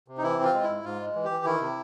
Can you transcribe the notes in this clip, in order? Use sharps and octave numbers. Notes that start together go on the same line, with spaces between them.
C3
D#4
E3 E4
C4 F4
G#3
E4
G#2
G#2 F4
G#3
E3
G4
E3
D#3 E4
C3